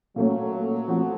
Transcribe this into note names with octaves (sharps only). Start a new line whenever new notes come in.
A#2 F#3 A3 C#4
F3 A3 C4 F#4 A4